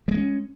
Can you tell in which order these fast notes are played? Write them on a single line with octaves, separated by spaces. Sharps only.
G3 G#3 A#3 C#4